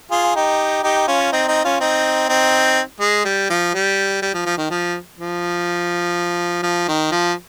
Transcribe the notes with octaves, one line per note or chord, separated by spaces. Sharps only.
F4 G#4
D#4 G4
D#4 G4
C#4 F4
C4 D#4
C4 D#4
C#4 F4
C4 D#4
C4 D#4
G#3
G3
F3
G3
G3
F3
F3
D#3
F3
F3
F3
D#3
F3